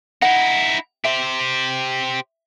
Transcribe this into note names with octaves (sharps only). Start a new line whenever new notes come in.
D#4 E4 F#5
G4 C5 E5